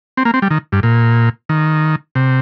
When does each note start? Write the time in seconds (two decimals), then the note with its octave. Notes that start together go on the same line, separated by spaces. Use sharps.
0.17 C4
0.25 A#3
0.34 C4
0.42 G3
0.51 D#3
0.72 G2
0.83 A#2
1.49 D#3
2.15 C3